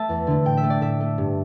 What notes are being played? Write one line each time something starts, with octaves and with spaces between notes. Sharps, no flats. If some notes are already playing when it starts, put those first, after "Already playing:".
Already playing: A3 E5 A5
E2
D3 A3
A2 G5
E5
A3
D5
A2 E5
A3
G2